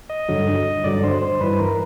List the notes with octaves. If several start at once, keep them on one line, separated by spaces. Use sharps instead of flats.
D#5
G2 D3 F#3
G2 D3 F#3 D5
C5
C5
G2 E3 B4
A#4